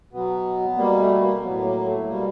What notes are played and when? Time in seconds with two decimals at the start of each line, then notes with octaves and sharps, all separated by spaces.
0.13 B2 F#3 B3
0.77 B2 G3 A#3
1.00 A3
1.21 A#3
1.43 A2 F#3 B3
1.64 A#3
1.86 A3
2.07 B2 G3 A#3